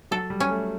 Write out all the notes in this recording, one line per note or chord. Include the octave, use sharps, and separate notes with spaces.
F#3 A4
G3
C#4
A3